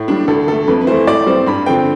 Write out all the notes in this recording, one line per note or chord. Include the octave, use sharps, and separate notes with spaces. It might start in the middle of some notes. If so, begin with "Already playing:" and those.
Already playing: A2
G3 D4
D2 A4
D3 A3 A4
F2 B4
B4
E3 A3 C5
A2 D5
G3 C4 C5
G2 B5
D3 F3 C4 G5